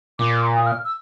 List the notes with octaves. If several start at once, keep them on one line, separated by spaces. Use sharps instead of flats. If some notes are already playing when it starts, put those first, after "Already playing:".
A#2 D6
D#6
F6
E6